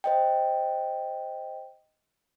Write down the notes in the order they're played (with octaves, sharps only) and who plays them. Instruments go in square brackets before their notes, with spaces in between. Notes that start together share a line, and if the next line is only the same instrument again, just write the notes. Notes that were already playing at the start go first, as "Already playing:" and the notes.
[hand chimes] C5 D#5 G5